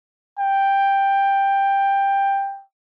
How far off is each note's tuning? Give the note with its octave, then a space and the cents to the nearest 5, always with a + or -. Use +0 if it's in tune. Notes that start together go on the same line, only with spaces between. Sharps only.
G5 +10